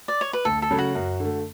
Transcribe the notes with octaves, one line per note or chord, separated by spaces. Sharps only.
D5
C#5
B4
D2 A4
A4
C#3 F#3 A3 C#4
F#4
F#2
D3 A3